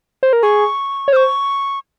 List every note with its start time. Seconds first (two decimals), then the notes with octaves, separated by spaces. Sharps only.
0.23 C5
0.33 A#4
0.43 G#4 C#6
1.08 C#5
1.13 C5 F6
1.16 C#6